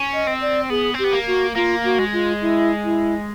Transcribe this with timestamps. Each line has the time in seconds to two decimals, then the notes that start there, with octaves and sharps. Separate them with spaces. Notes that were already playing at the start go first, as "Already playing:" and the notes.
Already playing: C#4
0.13 D#5
0.27 C4
0.41 D5
0.70 B3 G#4
0.94 C4 G4
1.04 B3
1.13 A#3
1.27 F#4
1.55 A#3 F4
1.84 F#4
1.99 G#3
2.13 F4
2.41 E4
2.84 E4